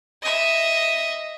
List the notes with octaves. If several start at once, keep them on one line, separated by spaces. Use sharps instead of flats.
D#5 E5